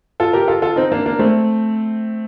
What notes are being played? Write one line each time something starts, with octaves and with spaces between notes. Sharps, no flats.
F4 A4
G4 A#4
F4 A4
F4 A4
C4 D#4
A#3 D4
A#3 D4
A3 C4